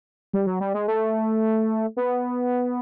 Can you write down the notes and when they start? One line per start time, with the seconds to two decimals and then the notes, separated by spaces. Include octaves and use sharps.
0.33 G3
0.47 F#3
0.60 G3
0.74 G#3
0.88 A3
1.97 B3